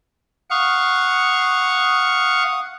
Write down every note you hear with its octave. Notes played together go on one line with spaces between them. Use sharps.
F5 F#5 C#6 D#6